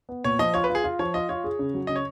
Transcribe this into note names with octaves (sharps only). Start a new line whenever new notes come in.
B3
A#2 C#5
F3 D#5
F4 C#5
B4
F4
G#4
F4
F3 C#5
F4 D#5
F4 C#5
G#4
C#3
F#3
C#3 D#5
C#5